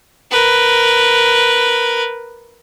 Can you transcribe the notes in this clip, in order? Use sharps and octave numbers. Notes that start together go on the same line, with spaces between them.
A#4 B4